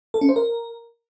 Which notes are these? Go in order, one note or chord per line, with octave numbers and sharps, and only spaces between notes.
A4
C#4
C5
A#4